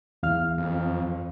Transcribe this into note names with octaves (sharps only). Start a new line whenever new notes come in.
E2 F5 F6
F2